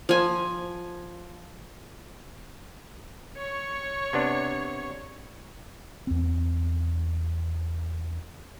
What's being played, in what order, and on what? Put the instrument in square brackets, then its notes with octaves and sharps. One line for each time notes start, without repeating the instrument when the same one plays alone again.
[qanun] F3 G#5
[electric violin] C#5 C#6
[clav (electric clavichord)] C3 B3 D4
[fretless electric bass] E2 C4